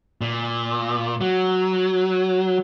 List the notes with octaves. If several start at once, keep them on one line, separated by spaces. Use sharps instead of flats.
A#2
F#3